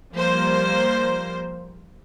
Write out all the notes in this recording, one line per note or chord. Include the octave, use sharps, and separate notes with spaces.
F3 G3 A#3 C5